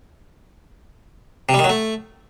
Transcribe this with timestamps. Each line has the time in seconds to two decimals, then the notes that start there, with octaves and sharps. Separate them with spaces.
1.49 C3
1.54 G3
1.59 D#3
1.64 F#3
1.69 A3